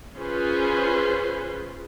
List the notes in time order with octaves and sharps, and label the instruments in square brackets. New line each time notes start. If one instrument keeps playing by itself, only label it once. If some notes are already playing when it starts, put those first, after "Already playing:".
[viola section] C#4 F4 G#4 B4 C5